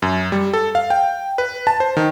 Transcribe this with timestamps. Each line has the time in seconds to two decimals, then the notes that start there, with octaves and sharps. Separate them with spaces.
0.02 F#2
0.32 G3
0.53 A4
0.75 F5
0.90 G5
1.38 B4
1.67 A5
1.80 C5
1.97 D#3